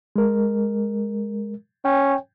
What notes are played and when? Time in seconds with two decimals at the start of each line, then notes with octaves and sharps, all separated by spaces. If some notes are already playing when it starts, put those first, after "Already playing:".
0.16 G#3 A#4
1.85 C#4 G5